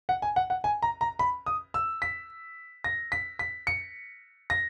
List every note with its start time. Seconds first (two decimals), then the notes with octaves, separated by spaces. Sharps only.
0.09 F#5
0.22 G#5
0.36 F#5
0.50 F#5
0.64 G#5
0.82 A#5
1.01 A#5
1.19 B5
1.46 D#6
1.74 E6
2.02 B6
2.84 A#6
3.12 B6
3.39 B6
3.67 C#7
4.50 A#6